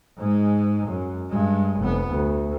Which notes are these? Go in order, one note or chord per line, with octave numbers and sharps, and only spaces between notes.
G#2 G#3
F#2
G2 G#3
F1 B3
D2